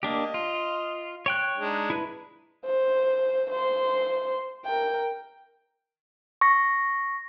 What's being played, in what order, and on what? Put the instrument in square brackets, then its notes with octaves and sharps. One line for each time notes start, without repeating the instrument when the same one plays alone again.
[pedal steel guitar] A#3 D4 G4 [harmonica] D#5
[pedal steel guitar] F4
C#5 G5 F#6
[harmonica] G#3 D4 D#4
[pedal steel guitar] E4 B4
[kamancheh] C5
C5 C6
A#4 G5
[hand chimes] C#6 A#6